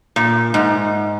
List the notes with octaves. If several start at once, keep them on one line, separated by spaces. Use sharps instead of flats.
A#2
G#2